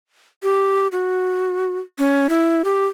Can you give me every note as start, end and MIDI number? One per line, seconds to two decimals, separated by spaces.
0.43 0.88 67
0.92 1.78 66
1.99 2.27 61
2.29 2.62 64
2.65 2.86 67